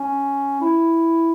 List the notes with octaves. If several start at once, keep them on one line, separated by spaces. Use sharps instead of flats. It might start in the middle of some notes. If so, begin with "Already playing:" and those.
Already playing: C#4
E4